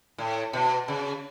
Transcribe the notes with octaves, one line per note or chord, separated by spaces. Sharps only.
A2
B2
C#3